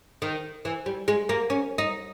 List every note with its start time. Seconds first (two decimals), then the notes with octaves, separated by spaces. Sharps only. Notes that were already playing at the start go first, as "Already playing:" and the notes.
0.22 D#3
0.65 E3
0.86 G3
1.08 G#3
1.29 A#3
1.50 C#4
1.78 D#4